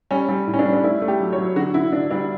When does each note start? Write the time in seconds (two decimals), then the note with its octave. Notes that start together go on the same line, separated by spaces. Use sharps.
0.11 G3 C#4
0.29 G3
0.47 A2
0.54 C#4
0.59 D4
0.65 G3
0.73 D4
0.84 A3 E4
1.02 A3
1.08 G4
1.20 F#3
1.33 C#5
1.38 F#3
1.56 D3 F#4
1.74 D3 E4
1.92 D3 D4
2.11 G3 D4